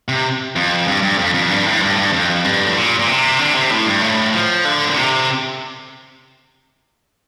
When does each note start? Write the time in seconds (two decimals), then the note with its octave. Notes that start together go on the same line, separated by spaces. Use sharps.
0.08 C3
0.56 F2
0.88 G2
1.03 G2
1.18 F2
1.34 F2
1.50 G2
1.66 A2
1.82 G2
1.92 A2
1.98 G2
2.13 F2
2.45 G2
2.65 A2
2.76 A#2
2.99 A#2
3.07 C3
3.39 D3
3.55 C3
3.71 A2
3.86 G2
4.02 A2
4.33 F3
4.65 D3
4.88 A#2
4.96 C3